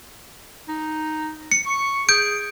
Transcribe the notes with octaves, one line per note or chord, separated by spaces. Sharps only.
D#4
C#7
C#6
G#4 G6 D7